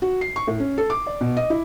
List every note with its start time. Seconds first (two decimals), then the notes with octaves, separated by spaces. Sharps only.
0.02 F#4
0.21 C7
0.36 C#6
0.47 A2
0.60 C#4
0.78 A4
0.90 D6
1.06 D5
1.21 B2
1.37 D#5
1.50 E4